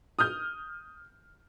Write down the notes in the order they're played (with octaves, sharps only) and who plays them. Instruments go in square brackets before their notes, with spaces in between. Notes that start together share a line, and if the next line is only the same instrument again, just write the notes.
[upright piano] D#6 F6 G6